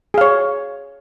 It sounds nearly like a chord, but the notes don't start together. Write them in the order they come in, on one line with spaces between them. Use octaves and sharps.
G#4 F5 C#5